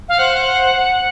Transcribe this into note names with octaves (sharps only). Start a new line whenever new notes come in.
F5
C5 F#5